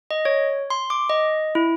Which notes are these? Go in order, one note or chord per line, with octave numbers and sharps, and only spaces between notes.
D#5
C#5
C6
D6
D#5
E4